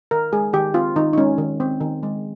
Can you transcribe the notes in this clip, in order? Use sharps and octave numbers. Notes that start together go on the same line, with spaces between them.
D#3 A#4
G#3 G#4
D#3 G4
C4 F4
D#3 D#4
D#4
G#3 C#4
D#3
C4
D#3
G#3